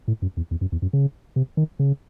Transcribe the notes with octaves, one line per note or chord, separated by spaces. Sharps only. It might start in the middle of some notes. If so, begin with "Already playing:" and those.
A2
F#2
E2
E2
F#2
E2
F#2
C#3
C3
D#3
C#3